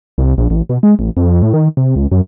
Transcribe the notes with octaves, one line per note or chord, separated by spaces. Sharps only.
C2
A#1
A1
B2
G#3
A1
F2
A2
D#3
C3
C#2
F#2